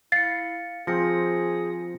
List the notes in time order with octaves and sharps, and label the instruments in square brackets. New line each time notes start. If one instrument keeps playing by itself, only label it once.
[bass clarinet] E4 [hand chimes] F5 C#7 [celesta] A6 C7
[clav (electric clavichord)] F3 C4 [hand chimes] F4 A#6 C#7 [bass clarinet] G#4